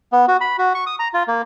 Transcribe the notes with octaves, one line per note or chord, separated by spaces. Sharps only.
B3
F#4
B5
F#4
C#6
D#6
A#5
F4
A#3